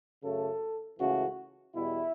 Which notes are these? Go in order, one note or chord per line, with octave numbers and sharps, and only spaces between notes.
F#2 C#3 F#3 A3 A4
C#2 C#3 E3 A3 F#4
E2 B2 G3 E4